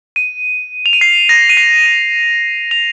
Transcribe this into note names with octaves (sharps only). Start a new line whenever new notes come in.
D#7
F7
D#7
C7
A#6
D#7
C7
D#7
F7